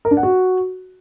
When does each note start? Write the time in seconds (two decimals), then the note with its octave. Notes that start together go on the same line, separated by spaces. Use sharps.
0.05 A#4
0.11 D4
0.17 F#5
0.23 F#4